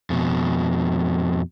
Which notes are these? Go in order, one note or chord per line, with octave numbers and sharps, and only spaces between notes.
F2 B2